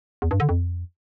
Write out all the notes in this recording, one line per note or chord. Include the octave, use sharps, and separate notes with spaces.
E2
G2
D3
F2